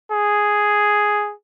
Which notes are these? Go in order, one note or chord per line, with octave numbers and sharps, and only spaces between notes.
G#4